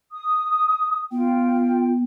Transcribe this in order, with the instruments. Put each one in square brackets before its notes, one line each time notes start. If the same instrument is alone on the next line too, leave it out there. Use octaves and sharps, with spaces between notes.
[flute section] D#6
[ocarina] B3 [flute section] F4 G5